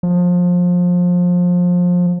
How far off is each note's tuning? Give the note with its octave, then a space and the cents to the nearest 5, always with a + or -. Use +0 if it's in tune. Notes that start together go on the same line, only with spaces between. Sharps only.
F3 +25